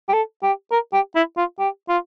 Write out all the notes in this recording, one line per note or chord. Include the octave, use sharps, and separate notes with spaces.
G4
A4
G4
A#4
G4
E4
F4
G4
F4